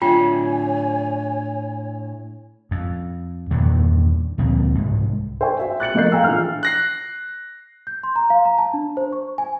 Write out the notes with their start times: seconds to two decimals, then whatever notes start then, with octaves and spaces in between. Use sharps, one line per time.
0.02 A2 D4 F4 C#5 E5 G5 G#5
2.71 F2
3.51 E2 G2 A#2 D#3
4.38 D2 A#2 F3 C4
4.75 C2 G#2
5.41 C5 E5 G5 G#5 C#6
5.59 F#4 E5
5.80 F#6 A6 C#7 F#7
5.94 F1 A3 A#3 D#5 G6 C7
6.12 F5 G5 G#5 A#5 E6
6.24 A#1 E3 F6
6.63 F#6 A#6 C7
7.87 G6
8.03 C6
8.16 A#5
8.30 F5
8.45 A#5
8.58 A5
8.74 D4
8.97 C5
9.12 C#6
9.38 G#5